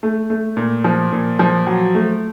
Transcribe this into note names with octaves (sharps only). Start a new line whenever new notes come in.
A3
A3
A#2
F3
A#2
F3
F#3
A3